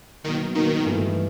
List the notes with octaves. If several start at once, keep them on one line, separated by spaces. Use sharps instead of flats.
B2 D#3 F#3 A#3
B2 D#3 F#3 A#3
G2 E3 A3